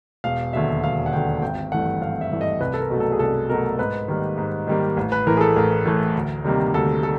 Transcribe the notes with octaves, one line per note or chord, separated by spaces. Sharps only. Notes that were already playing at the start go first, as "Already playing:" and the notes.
E1 F5
D#2 D3 F#3 E5
E1 F5
F#5
D#2 D3 F#3 G5
G#1 G5
G2 E3 A3 F#5
G#1 F5
E5
G2 E3 A3
D#5
C2 B4
A4
A#4
B2 F#3 A3
A4
G#4
C2 A4
B2 F#3 A3 A#4
G#2 B4
D#3 G3 A#3
G#2
D#3 G3 A#3
A1
B4
A2 E3 A3 A#4
G#4
A4
A1 A#4
A2 E3 A3
D2
C3 D#3 G3 A#3
D2 A4
A4